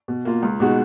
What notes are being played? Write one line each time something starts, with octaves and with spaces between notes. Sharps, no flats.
B2
A#3 F4
C#2
B2 G#3 D#4 F#4